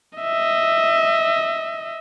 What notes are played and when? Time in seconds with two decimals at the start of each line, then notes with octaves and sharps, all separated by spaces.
0.18 D#5 E5